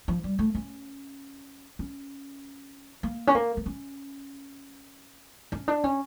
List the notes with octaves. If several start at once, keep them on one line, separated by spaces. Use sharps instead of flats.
F3
G3
A3
C#4
C#4
A#3
C#4
A#3
A#3
C#4
C#4
D4
C#4